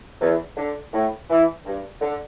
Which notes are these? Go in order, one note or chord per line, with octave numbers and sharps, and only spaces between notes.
E2
D3
A2
E3
G2
D3